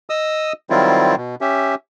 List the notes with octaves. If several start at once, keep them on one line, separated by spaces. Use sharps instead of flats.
D#5 D#6 E6
D#3 F#3 G3 C4 E4 F4
B2
C#4 G4 E5